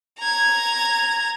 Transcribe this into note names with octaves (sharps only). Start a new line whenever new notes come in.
A#5 G#6